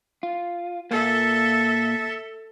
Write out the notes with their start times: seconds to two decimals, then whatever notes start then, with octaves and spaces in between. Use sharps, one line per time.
0.23 F4
0.91 A#2 A#3 A4 E5